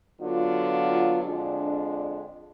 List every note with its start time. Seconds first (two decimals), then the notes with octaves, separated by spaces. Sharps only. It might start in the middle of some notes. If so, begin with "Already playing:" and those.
0.20 D3 F#3 B3 F4
1.24 F2 D3 G#3 D4